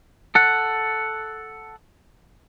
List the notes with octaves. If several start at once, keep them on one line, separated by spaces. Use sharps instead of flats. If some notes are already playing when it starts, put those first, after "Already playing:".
A4 F#5